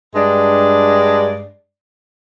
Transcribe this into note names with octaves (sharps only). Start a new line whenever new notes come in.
G2 G#3 D4 D5